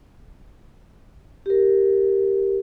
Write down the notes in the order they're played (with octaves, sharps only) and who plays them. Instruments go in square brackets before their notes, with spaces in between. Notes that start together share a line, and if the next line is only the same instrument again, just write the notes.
[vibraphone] G4 A#4